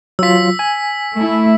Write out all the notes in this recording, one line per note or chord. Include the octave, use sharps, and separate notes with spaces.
F#3 F4 E6 B6
G#5
A3 E4